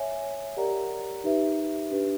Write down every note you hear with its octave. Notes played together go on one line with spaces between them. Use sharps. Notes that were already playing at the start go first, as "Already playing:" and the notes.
Already playing: C#5 E5 G#5
G4 A#4 D5 F#5 A#5
D#4 G4 B4 E5
D4 G4 B4